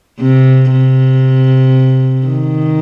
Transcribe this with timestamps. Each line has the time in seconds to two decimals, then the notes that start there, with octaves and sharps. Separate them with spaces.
0.20 C3
0.72 C3
2.27 D#3